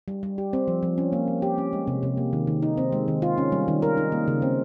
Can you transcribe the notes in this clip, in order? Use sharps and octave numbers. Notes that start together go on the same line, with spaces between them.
G3
G3
G4
C4
F3
F3
C#4
A#3
F3
G4
C#4
G#3
C3
C3
A#3
D#3
D#3
D#4
C4
G#3
D#3
F4
C#4
G3
D#3
A#4
D#4
A#3
C#3
C4